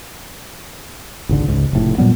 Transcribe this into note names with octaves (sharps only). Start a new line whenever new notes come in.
G#1 C#2 D3
C#2 G#2
F1 A2
A#2 F#3 G3 B3